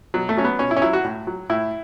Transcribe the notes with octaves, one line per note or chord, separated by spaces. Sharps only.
B2 F#3
A3
F#3 C#4
B3
B2 C#4
E4
C#4
F#3 E4
F#4
A2
F#3
A2 E4